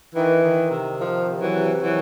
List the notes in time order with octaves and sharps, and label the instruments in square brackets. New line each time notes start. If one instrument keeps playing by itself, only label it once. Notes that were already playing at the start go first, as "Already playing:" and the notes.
[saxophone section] D#3 E3
D#3
C3
D#3 F3
C3
E3 F#3
C3
D#3 E3 F#3